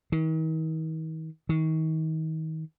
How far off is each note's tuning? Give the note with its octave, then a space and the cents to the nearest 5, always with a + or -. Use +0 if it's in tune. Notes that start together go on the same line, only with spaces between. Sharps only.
D#3 +40
D#3 +35